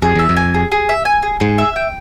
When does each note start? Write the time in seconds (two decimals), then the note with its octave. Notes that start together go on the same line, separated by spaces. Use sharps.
0.02 F2 G#4
0.15 E2 E5
0.29 F2
0.37 G#5
0.54 G#4
0.72 G#4
0.89 E5
1.05 G#5
1.23 G#4
1.40 G#2 G#4
1.58 E5
1.76 G5